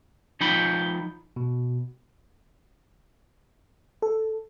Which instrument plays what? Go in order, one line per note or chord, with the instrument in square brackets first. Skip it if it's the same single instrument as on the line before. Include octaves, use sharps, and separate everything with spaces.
[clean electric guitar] F3 D#4 G5 B5
[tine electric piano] B2
[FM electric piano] A4